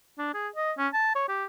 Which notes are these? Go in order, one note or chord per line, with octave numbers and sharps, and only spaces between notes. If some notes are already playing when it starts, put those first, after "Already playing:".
D4
G#4
D#5
C#4
A5
C#5
G4